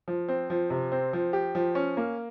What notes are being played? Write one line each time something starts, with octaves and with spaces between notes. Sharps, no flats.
F3
C4
F3
C3
C4
F3
G4
F3
C#4
A#3